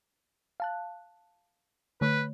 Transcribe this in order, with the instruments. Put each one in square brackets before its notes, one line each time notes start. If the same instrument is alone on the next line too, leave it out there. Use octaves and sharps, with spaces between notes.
[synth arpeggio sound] F5 A5 F#6
[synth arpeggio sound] D3 A3 C#5 [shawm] B4